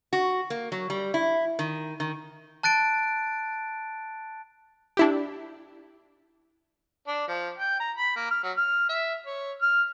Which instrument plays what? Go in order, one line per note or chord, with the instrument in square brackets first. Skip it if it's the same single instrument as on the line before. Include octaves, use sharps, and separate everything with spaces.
[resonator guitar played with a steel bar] F#4
A#3
F#3
G3
E4
D#3
D#3
[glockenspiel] A5 F#6 A6 D7
[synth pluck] D4 E4 G4
[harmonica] D4
F3
G5
A#5
B5
A#3
F6
F#3
F6
E5
C#5
F6